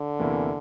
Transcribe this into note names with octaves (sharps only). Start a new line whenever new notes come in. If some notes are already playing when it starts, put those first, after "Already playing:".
Already playing: D3
E2 C3 E3 A#3 E4